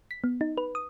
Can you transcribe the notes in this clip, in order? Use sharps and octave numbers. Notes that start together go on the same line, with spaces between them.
B6
B3
D#4
B4
D#6